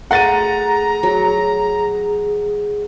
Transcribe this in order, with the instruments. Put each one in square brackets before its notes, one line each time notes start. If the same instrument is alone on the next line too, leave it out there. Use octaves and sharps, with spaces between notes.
[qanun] A3 C6 [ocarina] G#4 [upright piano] F#5 A6 D#7 [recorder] A#5
[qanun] F#3